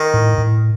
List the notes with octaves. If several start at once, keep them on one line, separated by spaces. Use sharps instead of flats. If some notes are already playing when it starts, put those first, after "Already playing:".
Already playing: D#3
A2
A2